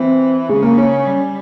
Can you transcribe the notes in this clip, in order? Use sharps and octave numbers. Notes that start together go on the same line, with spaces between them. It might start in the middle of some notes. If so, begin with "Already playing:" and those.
Already playing: E3 C4
C#3 G#3
A#3
C#4
G3